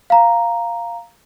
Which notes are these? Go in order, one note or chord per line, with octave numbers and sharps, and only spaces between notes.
F5 A#5